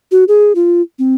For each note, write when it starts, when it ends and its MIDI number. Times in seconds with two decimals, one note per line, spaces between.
0.12 0.24 66
0.28 0.53 68
0.55 0.82 65
0.99 1.16 60